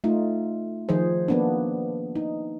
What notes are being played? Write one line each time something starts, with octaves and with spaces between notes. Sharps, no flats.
A3 D#4 F4
D#3 F3 G#4 C5
A#3 B3 D4
D#4